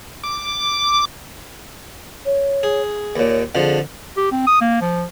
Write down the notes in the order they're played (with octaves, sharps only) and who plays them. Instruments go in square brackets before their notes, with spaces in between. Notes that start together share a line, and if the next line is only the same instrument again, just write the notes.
[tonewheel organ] D6
[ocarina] C#5
[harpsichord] G#4
[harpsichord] D#2 A#2 [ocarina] C#5
[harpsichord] F2 D3 F3 [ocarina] G#4
[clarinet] G4
C4
D#6
A#3
F3